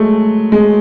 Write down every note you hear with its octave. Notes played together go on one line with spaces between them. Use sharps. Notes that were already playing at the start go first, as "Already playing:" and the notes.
Already playing: F#3 G#3 A3
G#3